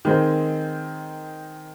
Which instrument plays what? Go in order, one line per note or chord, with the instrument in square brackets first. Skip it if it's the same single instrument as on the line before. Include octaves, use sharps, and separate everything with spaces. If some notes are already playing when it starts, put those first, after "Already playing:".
[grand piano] D#3 G#3 C4